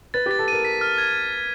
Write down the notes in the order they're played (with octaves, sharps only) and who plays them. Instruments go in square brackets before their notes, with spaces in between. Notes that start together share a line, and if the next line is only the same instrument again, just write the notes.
[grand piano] B4 [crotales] A6
[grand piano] G4 [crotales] A6
[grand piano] A4
[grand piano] A#4 [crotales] D#7
[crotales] B6
F6
G#6